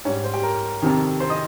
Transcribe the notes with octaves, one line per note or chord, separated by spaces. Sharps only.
G#2 G3 C#4 C#5
C5
G4 G5
A#4 A#5
F2 C3 D#3
C5 C6
D#5 D#6